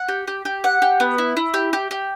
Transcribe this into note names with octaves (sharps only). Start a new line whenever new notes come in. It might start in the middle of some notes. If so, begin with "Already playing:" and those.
Already playing: F#5
G4
G4
G4
F#5
G4
B3
E4
E4
G4
G4
G4